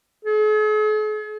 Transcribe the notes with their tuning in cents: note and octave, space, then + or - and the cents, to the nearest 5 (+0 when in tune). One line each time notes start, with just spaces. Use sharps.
G#4 +45